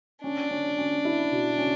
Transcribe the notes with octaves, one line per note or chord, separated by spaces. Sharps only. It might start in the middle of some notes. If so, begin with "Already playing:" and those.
C#4 D4
C#4
C#4
E4
B2
C#4